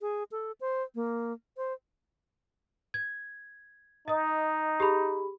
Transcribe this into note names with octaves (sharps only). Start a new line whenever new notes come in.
G#4
A4
C5
A#3
C5
G#6
D#4 D#5 D#6
G4 G#4 B5